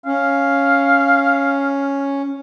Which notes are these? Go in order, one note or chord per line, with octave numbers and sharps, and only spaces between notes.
C#4 F5